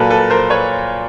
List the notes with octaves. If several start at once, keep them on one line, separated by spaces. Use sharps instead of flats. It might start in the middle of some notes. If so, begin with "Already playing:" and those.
Already playing: A#2 F#3 A#3 A4 B4
A4 B4
A#4 C5
B4 C#5